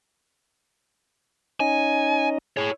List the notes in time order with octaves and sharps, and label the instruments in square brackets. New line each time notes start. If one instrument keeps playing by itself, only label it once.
[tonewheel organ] C#4 D#4 D#5 [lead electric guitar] G#5
[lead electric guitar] E4 C#5 [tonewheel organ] G#4